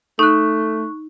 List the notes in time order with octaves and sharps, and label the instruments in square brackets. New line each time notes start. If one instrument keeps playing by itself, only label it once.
[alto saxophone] A3 [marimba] D#4 [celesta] C#6 F#6